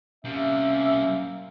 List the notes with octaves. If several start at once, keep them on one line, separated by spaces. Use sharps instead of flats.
C3 G3 A#3 C#4 E5